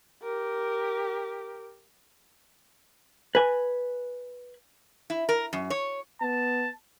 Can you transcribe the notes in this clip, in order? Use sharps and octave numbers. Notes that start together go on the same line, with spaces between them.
G4 A#4
B4 G#5
E4
A#4
F#2
C#5
B3 A5